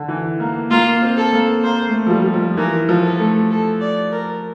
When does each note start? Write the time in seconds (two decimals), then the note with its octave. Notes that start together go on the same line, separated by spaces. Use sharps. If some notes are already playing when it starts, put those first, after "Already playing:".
Already playing: D3
0.08 E3
0.40 A#3
0.71 A#3 F4
1.02 C4
1.17 A4
1.33 A#3
1.64 A#3 C5
1.88 A3
2.07 F3
2.10 G3
2.34 F3
2.57 E3 A#4
2.89 F3
3.04 A4
3.19 A3
3.50 A4
3.81 D5
4.12 A#4